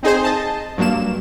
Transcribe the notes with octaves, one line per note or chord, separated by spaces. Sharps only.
C4 D#4 G#4 C5
D#5 A5
G2 F#3 A#3 E7